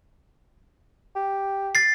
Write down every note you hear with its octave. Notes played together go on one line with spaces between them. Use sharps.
G4
A6 C7